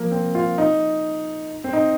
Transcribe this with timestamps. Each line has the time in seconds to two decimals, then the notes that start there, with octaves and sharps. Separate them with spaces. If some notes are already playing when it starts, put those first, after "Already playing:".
Already playing: F3 A#3
0.11 C4
0.35 F4
0.58 D#4
1.64 C4
1.73 D#4